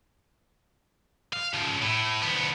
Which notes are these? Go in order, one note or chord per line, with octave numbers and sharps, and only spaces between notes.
F5
C#3 F3
A2
D2 B3